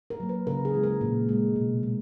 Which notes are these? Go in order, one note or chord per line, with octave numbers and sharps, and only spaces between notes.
A#4
F#3 A#3
B4
C#3 A#4
G#4
E3 G#3
A#4
A#2
G#3
B2
G#3